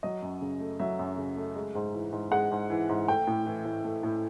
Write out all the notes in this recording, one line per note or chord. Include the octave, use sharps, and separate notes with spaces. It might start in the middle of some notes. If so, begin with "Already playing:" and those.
F#3 D#5
F#2
C#3
A3
F#3 E5
F#2
C#3
A3
G#3
G#2
E3
G#2
G#3 F#5
G#2
E3
G#2
A3 G5
A2
E3
A2
A3
A2